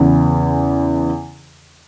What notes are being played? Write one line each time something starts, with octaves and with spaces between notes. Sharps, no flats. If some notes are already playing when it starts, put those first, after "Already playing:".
Already playing: E2 C#3 E3